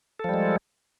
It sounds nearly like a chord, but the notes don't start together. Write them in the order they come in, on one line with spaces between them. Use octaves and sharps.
A4 F3 G3 G#3